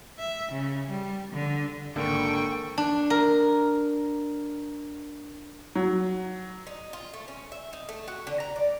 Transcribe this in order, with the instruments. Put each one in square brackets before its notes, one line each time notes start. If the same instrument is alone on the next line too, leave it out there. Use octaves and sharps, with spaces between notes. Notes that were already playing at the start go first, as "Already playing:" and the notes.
[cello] E5
C#3
G3
D3
[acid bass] G#1 [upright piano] D3 A#3 [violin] G5 C#6
[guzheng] D4
A#4
[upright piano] F#3
[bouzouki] D#4
F4
A3
C#4
E5
D#4
A3
F#4
D3
A#5
D5